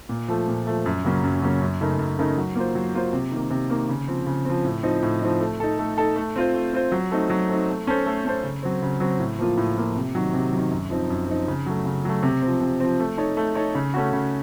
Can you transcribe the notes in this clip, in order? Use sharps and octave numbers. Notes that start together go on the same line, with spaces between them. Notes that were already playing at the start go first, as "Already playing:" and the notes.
A#2
F3 A3
A#2
F3 A3
F#2
C#3 F#3 A#3 C#4
F#2
C#3 F#3 A#3 C#4
F#2
C#3 A3 D#4 A#4
F#2
C#3 A3 D#4 A#4
F#3
A#3 F4 C5
F#3
A#3 F4 C5
C3
D#3 A#3
C3
D#3 A#3
C#3
F3 C4
C#3
F3 C4
A2
F3 C4 D#4
A2
F3 C4 D#4
A3
D#4 A4
A3
D#4 A4
A3
C4 F4 C5
A3
C4 F4 C5
F#3
A3 C4 D#4
F#3
A3 C4 D#4
A3
C#4 A4 C5
A3
C#4 A4 C5
C#3
F#3 C4
C#3
F#3 C4
A2
F3 A#3 F4
A2
F3 A#3 F4
C3
D#3 F#3
C3
D#3 F#3
F#2
F3 C4 D#4
F#2
F3 C4 D#4
C#3
F#3 A3
C#3
F#3 A3
C3
F3 C4
C3
F3 C4
A3
D#4 A4 C#5
A3
D#4 A4 C#5
C#3
A3 C#4 F#4
C#3